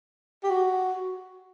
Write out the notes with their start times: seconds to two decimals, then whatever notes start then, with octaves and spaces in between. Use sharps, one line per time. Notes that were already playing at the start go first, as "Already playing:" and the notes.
0.43 G4
0.50 F#4